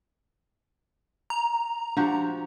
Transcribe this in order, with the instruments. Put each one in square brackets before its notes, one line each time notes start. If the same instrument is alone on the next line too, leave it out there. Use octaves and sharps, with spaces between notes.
[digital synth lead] A#5
[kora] F3 F#4 G4 [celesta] D4